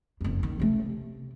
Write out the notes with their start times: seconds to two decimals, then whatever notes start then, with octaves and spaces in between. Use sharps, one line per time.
0.21 F#1 F2
0.43 D#3
0.60 C#3 A3
0.86 C3